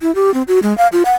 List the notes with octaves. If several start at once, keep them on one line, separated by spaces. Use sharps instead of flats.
E4
G4
C4
F#4
G#3
F5
F4
F#5